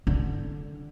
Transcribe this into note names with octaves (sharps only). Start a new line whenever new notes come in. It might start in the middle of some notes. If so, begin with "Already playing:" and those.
D3